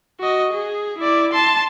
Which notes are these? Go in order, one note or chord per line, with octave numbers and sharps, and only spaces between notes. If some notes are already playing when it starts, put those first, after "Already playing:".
F#4 D#5
G#4
E4 D5
A5 C6